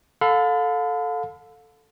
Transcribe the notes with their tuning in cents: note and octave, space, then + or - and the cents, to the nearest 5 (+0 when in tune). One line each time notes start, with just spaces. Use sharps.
A4 +0 F5 +35 B5 +40